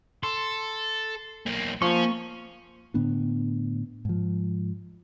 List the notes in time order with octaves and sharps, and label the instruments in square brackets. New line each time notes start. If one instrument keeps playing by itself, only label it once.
[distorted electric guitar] A4 [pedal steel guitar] C6
[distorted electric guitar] B1 A#3
[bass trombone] F3 [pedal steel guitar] A#3 C#6 [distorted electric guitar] C#4
[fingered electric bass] A2 D3 B3 D4
G#2 F3